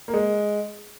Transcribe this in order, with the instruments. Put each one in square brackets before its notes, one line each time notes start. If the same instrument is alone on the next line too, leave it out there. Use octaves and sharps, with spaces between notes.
[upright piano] A#3
G#3